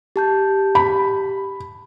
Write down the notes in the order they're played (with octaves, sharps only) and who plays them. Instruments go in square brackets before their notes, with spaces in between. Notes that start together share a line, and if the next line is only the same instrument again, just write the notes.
[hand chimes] G4 A5 G6
[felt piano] B5